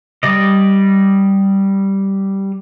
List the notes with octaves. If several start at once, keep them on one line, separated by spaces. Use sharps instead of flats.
G3 D5 D#5